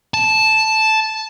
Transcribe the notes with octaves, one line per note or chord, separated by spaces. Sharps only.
A5